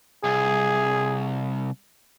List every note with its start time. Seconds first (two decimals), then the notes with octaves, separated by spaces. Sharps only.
0.24 C2 G#4